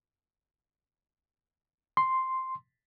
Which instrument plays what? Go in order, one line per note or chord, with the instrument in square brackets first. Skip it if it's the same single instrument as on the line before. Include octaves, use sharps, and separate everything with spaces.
[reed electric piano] C6